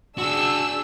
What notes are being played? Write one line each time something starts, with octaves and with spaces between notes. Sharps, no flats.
D4 F#4 G#4 E6